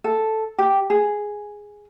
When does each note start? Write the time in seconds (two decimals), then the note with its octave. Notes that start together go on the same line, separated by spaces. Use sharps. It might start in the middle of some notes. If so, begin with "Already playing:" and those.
0.04 A4
0.58 G4
0.90 G#4